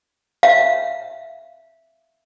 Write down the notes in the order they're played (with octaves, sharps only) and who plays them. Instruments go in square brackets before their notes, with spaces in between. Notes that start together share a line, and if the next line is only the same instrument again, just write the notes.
[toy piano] E5 F5